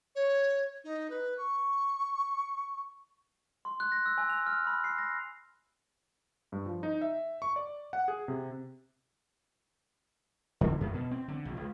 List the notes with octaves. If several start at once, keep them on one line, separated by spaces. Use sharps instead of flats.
C#5
D#4
B4
C#6
C6
F#6
A#6
E6
G#5
F7
F6
B5
C7
A#6
G2
F3
D#4
E5
C#6
D5
F#5
G#4
C3
D3
F#2
B2
C4
D3
A#1
C#2